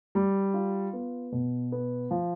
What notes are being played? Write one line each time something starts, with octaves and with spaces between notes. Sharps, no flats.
G3
F4
B3
B2
B3
F3